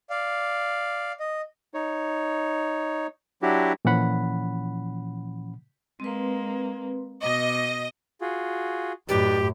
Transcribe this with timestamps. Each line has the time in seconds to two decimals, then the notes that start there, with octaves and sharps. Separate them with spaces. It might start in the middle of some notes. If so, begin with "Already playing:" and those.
0.10 D5 F5
1.20 D#5
1.74 D#4 C#5
3.42 F#3 D4 E4 F#4 G4
3.85 A#2 E3 F3 C#4 F#5 B5
6.00 G#3 A#3 C4 B4
7.22 B2 D#5 D6 A#6
8.21 F4 F#4 G#4
9.09 F#2 A2 D#4 G4 B4 D5